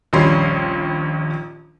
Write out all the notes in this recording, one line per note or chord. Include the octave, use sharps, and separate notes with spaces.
A#1 D#2 G3 C#4 B5 C6